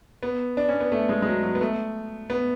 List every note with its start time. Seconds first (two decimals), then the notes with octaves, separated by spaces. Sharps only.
0.23 B3
0.57 D4
0.69 C#4
0.80 B3
0.92 A3
1.09 G#3
1.22 G#3
1.27 F#3
1.43 F#3
1.55 B3
1.61 A3
2.30 B3